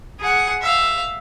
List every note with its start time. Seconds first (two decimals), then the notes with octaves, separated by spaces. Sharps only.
0.20 G#4 F#5
0.62 E5 F5